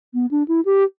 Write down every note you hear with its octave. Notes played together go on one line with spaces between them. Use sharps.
B3
D4
E4
G4